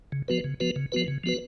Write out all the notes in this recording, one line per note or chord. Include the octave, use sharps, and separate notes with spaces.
C#3
F3 B3 F#4 B4
C#3
F3 B3 F#4 B4
C#3
F3 B3 F#4 B4
C#3
F3 B3 F#4 B4